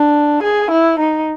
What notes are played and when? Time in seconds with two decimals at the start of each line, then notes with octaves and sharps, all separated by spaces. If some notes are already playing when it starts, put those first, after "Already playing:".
Already playing: D4
0.43 G#4
0.70 E4
0.99 D#4